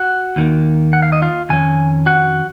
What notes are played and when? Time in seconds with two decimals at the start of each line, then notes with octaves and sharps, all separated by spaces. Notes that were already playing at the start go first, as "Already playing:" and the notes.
Already playing: F#4 F#5
0.36 D#2 D#3 A#3
0.93 F#5
1.02 F5
1.12 D#5
1.22 F4 F5
1.49 F2 D#3 C#4 G#5
2.06 F#4 F#5